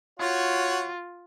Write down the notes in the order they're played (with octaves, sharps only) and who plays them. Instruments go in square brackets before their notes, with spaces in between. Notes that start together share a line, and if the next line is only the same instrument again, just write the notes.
[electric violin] F4 [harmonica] F#4 C#5